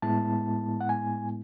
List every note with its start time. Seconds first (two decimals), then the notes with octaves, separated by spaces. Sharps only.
0.02 A2 G#3 B3 E4 A5
0.81 F#5
0.89 G#5